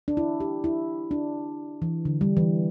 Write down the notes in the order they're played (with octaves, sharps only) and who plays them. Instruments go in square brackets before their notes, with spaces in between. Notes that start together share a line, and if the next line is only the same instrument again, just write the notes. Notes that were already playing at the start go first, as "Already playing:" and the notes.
[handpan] D4
E4
G4
E4
D4
E3
D3
G3
E3